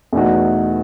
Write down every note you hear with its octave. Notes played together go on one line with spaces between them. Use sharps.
E2 B2 A3 D#4 F#4